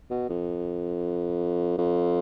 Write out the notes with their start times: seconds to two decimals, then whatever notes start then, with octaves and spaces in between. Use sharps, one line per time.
0.10 B2
0.29 F2
1.78 F2